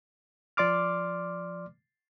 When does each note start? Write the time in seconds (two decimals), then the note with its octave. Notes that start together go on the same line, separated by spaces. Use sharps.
0.57 F3 D5 C6 D6 F6